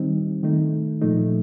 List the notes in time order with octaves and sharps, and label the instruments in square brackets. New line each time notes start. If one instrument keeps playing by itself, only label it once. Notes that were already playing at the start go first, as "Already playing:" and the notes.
Already playing: [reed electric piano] D#3 G3 C4 D#4
D#3 A3 D#4
A#2 F3 A3 D#4